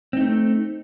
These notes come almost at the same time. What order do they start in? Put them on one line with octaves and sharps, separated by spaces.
C4 D#4 A3